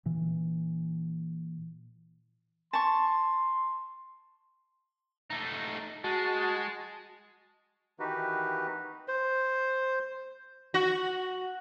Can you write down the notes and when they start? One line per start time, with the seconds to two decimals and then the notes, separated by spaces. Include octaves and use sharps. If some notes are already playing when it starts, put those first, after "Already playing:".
0.06 A#2 E3
2.73 A5 C6 C#6
5.30 A3 D#4
6.04 G#3 F#4 A5
7.99 D#3 E3 D#4 F#4 G4 B4
9.08 C5
10.74 F#4